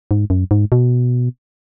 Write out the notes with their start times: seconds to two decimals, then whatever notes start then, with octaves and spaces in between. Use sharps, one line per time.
0.11 G#2
0.30 F#2
0.51 G#2
0.72 B2